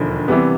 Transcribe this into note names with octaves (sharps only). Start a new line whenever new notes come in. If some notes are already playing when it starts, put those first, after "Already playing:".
Already playing: E1 D#2 D3 F3
C3 E3 G3 B3